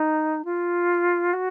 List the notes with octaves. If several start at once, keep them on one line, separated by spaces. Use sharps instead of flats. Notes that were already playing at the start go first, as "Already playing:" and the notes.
Already playing: D#4
F4
F#4